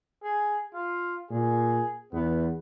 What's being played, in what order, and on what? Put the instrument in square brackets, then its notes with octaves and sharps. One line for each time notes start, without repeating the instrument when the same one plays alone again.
[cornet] G#4
F4
[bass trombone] A#2 [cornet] G#4
[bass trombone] E2 [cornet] B3